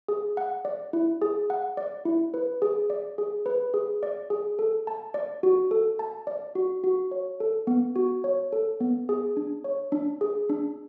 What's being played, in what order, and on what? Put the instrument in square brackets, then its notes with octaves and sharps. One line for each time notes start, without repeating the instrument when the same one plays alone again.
[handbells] G#4
F#5
D5
E4
G#4
F#5
D5
E4
B4
G#4
D5
G#4
B4
G#4
D5
G#4
A4
A5
D5
F#4
A4
A5
D5
F#4
F#4
C#5
A4
B3
F#4
C#5
A4
B3
G#4
D4
C#5
D4
G#4
D4